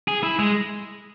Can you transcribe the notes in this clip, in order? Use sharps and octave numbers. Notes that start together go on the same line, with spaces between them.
G#4
E4
G#3